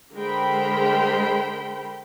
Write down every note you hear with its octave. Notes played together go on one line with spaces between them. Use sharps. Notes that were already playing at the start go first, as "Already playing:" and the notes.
D3 G#3 A#4 C5 G5 B5